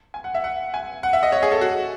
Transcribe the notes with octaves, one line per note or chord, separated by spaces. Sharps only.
G#5
F#5
E5
F#5
G#5
F#5
E5
D#5
C#5
G#4
A4
F#4